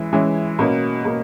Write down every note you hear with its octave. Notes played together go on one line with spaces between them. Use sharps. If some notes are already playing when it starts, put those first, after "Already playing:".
Already playing: E3 G#3 C#4 E4
E3 G#3 C#4 E4
B2 A#3 C#4
B2 A#3